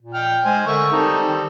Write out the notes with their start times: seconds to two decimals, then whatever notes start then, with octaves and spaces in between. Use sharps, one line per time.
0.02 A#2
0.14 G5 F6
0.45 G#3 C5 G#5
0.67 D3 A#4 E5 C#6
0.92 G3 C4 D#4 A4
1.27 D#3